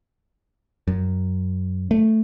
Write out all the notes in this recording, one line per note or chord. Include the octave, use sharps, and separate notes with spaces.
F#2
A3